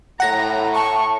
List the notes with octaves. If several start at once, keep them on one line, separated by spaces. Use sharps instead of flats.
A2 F#5 A#5 A#6
A5 C#6